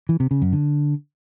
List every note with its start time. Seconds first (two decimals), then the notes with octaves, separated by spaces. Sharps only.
0.09 E3
0.20 C3
0.31 C#3
0.42 F#2
0.53 D3